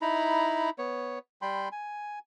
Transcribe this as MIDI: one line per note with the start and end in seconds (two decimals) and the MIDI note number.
0.02 0.70 63
0.02 0.70 64
0.02 0.70 82
0.02 0.70 83
0.78 1.19 59
0.78 1.19 73
1.42 1.69 55
1.42 1.69 79
1.42 1.69 83
1.42 1.69 84
1.72 2.19 80